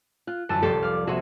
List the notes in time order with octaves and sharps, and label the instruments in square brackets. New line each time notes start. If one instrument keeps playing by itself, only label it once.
[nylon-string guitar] F4 [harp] F#6
[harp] G1 F#2 E7 [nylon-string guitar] E3 [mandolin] A5 E6
[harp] F1 C2 C6 [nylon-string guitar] G4 A4
[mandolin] D5 F5
[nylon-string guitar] C3 F#4 [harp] A#3 G#4 E5